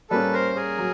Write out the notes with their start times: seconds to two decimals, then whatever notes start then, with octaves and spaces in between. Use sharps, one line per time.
0.10 G3 A#3 C#4 A4 B4
0.33 A#4 C5
0.55 G#4 A#4
0.78 F#3